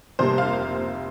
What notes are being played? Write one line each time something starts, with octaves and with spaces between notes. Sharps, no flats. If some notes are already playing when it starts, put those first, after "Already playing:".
F1 F2 C3 G3 A#3 C5
F5